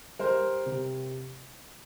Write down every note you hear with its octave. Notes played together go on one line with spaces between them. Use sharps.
G3 A#4 C5
C3